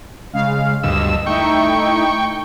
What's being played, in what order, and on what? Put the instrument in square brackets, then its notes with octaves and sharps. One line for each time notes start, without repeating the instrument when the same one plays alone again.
[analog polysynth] C#3 G#3 F5
[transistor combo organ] D2 G2 E6 [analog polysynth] D#5
[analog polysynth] A3 D#4 E4 [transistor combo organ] G5 C#6